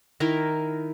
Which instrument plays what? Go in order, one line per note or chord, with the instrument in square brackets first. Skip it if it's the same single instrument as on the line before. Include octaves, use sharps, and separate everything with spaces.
[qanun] D#3 E4 A#4